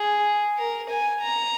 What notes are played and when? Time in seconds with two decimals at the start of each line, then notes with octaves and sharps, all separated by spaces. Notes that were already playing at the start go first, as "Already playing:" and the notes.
Already playing: G#4
0.58 A#4
0.90 G#5
1.22 A#5